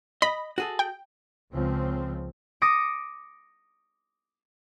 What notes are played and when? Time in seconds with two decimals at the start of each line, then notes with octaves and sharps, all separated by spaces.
0.22 D#5 B5
0.58 F#4 G#4 A4
0.79 G5
1.52 C#2 C#3 F3 C4
2.62 D6 D#6 A#6 C#7 D7